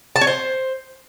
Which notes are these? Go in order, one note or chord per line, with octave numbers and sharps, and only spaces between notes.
A5
C#5
C5